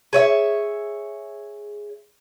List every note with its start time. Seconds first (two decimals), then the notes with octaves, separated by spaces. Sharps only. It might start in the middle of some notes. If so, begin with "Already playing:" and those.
0.13 G#4 C#5 E5